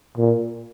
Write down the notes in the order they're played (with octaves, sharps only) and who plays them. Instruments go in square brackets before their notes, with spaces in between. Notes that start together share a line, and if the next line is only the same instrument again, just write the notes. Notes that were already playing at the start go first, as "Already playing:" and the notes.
[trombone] A#2